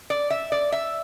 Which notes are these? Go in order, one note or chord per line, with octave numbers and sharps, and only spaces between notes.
D5
E5
D5
E5